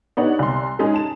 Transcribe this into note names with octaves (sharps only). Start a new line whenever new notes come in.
B3 D4 D#4 G4 C#5 F#5
C2 C6
G#3 C#4 D#4 G#4
A5 E7